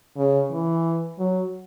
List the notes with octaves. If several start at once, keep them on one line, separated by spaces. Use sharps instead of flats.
C#3
E3
F#3